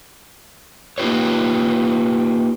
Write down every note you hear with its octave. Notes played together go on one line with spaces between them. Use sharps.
A#3 D#4 F4 G4 B4 C#5